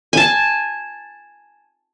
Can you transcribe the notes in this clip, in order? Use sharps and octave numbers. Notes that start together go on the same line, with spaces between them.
G#5 A5